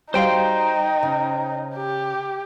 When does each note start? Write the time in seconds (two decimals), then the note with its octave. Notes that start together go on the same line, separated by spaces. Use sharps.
0.14 G3 D#4 F#4 C5 F5 G5 C6
1.03 C#3
1.76 G4